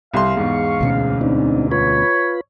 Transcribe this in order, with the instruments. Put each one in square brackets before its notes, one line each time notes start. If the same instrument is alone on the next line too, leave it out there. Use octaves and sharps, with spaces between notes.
[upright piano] C2 C6 [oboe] F5
[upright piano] E2 G#2 [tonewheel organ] C#6
[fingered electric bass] D2 B2 C#4
[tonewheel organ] C4 D4 D#4
[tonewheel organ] F4 B4 B5 [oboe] C#5